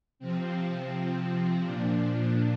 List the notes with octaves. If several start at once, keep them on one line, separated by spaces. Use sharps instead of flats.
C3 F3 C4
C4
A#2 F3 D4